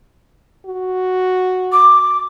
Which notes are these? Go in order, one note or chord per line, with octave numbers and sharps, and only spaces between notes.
F#4
D6